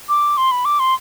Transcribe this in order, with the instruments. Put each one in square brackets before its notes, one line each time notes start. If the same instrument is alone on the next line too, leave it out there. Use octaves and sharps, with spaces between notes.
[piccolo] D6
C6
B5
D6
C6